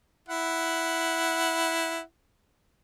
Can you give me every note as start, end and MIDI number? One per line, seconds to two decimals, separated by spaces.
0.29 2.00 64
0.29 2.00 78